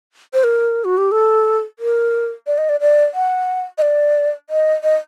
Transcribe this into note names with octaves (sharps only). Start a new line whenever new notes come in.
C5
A#4
F#4
G4
A4
A#4
D5
D#5
D5
D5
F#5
D#5
D5
D#5
D#5